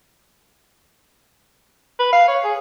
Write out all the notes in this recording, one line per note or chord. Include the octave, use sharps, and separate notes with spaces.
B4
F5
C#5
G#4